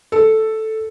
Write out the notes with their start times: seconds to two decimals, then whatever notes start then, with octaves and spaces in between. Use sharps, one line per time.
0.12 A4